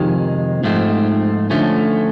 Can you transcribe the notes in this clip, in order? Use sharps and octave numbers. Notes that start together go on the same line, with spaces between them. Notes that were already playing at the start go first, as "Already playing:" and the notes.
Already playing: F2 C3 D#3 G#3
G#2 F3 A3 C4
D3 F3 A3 C#4